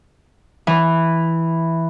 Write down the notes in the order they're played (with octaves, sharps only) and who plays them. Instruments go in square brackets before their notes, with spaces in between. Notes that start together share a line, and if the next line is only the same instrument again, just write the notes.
[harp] E3